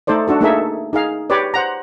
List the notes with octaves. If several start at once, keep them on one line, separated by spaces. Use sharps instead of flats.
A3 D#4 A4 C5 D5
D4 F#4 A4
A3 A#3 D#4 G#4 A4 E5
D#4 G#4 F5
G4 B4 C#5 D5
C5 F#5 A#5